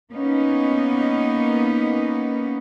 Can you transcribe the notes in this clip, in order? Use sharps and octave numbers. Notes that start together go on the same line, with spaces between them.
A#3 B3 C#4 D#4